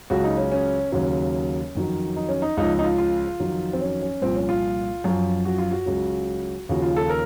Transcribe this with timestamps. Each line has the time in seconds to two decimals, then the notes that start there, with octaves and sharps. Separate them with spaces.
0.10 C#2 C#3 F#3 F#4
0.24 D#4
0.38 C#4
0.52 C#4
0.92 D#2 C#3 F#3 C#4
1.75 F2 D#3 F#3
2.16 D#4
2.29 C#4
2.42 D#4
2.57 C#2 C#3 F3 D#4
2.79 D#4
2.84 F4
2.98 F4
3.40 F2 D#3 F#3
3.73 C4
3.81 C#4
4.02 C#4
4.22 C2 A#2 F3 C4
4.35 C#4
4.49 F4
5.04 F#2 F3
5.45 F#4
5.58 F4
5.71 F#4
5.86 C#2 C#3 F#3
6.69 D#2 C#3 F3 F#4
6.82 F4
6.96 A4
7.09 A#4